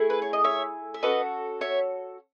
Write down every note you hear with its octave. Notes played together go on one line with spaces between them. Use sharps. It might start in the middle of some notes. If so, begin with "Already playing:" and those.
Already playing: A3 E4 G#4
B4
C#5
D#5
C#5 E5
E5
C#4 F#4 A4 B4 D#5
C#5 E5